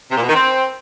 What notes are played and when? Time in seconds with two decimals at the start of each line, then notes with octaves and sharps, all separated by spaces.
0.11 C3
0.17 A#2
0.23 B2
0.29 D#3
0.35 C4